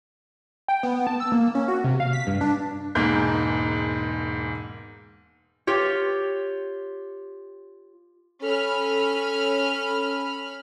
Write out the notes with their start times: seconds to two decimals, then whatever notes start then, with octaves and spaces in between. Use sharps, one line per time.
0.68 G5
0.83 B3
1.07 A5
1.20 E6
1.32 A#3
1.55 C#4
1.68 F#4
1.84 C3
2.00 F5
2.13 B6
2.27 G2
2.41 D4
2.95 E1 G#2 A#3 G6
5.67 F4 G4 C#5
8.42 C#4 A4 B5 F6